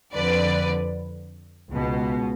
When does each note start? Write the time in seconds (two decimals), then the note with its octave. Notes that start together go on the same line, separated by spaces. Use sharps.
0.13 F2 D3 B4 D5
1.70 C#2 B2